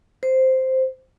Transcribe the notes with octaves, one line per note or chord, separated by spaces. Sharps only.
C5